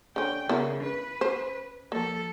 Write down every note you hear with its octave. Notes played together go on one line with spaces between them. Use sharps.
D3 C#4 G5
C#3 B3 E4 A#4
B4
C#4 C5
F3 A#3 A4